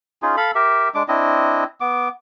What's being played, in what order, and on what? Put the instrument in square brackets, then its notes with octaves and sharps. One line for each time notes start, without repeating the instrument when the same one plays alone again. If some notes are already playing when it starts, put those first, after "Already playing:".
[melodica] C#4 D#4 F4 G#4
A4 F5 B5
G4 A#4 E5
G#3 D4 D6
C4 D4 E4 D#5
B3 D6